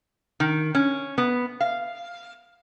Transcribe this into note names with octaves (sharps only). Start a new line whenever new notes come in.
D#3
C#4
B3
F5